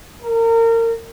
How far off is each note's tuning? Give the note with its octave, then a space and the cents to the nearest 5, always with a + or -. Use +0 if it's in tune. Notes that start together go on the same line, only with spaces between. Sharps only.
A#4 -30